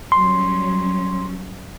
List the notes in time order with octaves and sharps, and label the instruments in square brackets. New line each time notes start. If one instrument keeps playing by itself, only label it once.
[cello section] F#3 G3 C#4 [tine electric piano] C6